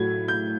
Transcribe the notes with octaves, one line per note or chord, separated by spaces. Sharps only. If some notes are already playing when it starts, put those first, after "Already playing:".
Already playing: A2 F#3 A3 G#6
G6